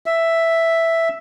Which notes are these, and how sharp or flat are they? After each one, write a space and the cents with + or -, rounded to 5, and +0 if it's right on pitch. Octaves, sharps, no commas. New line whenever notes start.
E5 +0